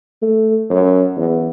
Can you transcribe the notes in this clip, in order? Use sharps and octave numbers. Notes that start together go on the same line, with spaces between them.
A3
F#2
E2